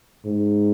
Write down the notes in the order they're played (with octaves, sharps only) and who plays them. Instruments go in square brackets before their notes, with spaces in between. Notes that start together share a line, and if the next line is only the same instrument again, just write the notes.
[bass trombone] G#2